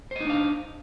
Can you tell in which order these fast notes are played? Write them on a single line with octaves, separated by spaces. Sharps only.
C5 D#5 D#4 D4 F5